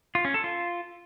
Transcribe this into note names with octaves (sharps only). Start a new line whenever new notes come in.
F4
C#4
A4
F4